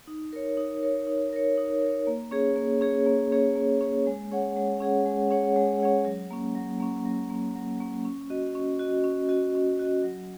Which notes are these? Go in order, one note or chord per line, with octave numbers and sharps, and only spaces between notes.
D#4
A#4 C#5
D#4
A#4 C#5
D#4
A#4 C#5
D#4
A#4 C#5
A#3
C#4 G#4 C#5
A#3
C#4 G#4 C#5
A#3
C#4 G#4 C#5
A#3
C#4 G#4 C#5
G#3
C#4 G#4 C#5 F#5
G#3
C#4 G#4 C#5 F#5
G#3
C#4 G#4 C#5 F#5
G#3
C#4 G#4 C#5 F#5
F#3
A#3 C#4
F#3
A#3 C#4
F#3
A#3 C#4
F#3
A#3 C#4
C#4
F#4 D#5
C#4
F#4 D#5
C#4
F#4 D#5
C#4
F#4 D#5
F#3